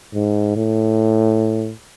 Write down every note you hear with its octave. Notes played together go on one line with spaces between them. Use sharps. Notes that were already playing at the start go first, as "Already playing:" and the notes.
G#2
A2